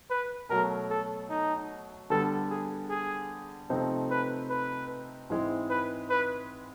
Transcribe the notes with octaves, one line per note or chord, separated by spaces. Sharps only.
B4
B2 F#3 A3 A#4
A4
D#4
D3 G3 B3 A4
G#4
G#4
C3 F3 A3 C4 D#4
B4
B4
G#2 E3 G#3 C4 E4
B4
B4